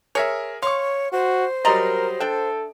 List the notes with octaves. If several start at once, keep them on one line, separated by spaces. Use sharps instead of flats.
G#4 A#4 C#5 E5
C#5 F5 C6 C#6
F#4 C5
F#3 G3 A#4 D5 D#5 A#5 C6
D4 A4 E5 G5